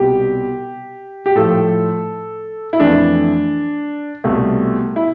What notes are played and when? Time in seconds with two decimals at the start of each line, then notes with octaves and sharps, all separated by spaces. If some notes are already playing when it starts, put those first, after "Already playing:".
Already playing: C2 B2 G3 G4
1.26 G4
1.35 A2 F3 A3 A4
2.73 E4
2.80 F2 E3 A3 D4
4.24 C2 B2 A3
4.96 E4